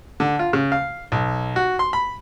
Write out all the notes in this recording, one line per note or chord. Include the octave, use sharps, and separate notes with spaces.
D3
F4
C#3
F5
B1
F#4
C6
B5